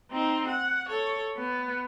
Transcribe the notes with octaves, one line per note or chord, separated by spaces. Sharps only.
C4 D#4
F#5
A4 C#5
B3